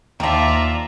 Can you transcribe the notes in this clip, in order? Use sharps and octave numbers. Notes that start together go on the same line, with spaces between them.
D#2 D#3 F3 F4 D5 E5 A#5